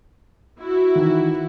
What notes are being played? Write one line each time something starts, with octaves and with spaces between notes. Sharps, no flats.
E4 F#4
D#3 E3